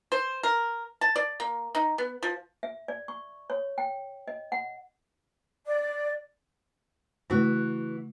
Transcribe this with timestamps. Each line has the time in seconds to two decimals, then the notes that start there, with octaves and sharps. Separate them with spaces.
0.12 C5
0.43 A#4
1.01 A5
1.16 D5
1.40 A#3
1.75 D#4
1.98 B3
2.23 F3
2.63 E5
2.88 D5
3.08 C#6
3.50 C#5
3.78 G5
4.28 D#5
4.52 F#5
5.65 D5
7.30 C#3 E3 A3 E4 F#4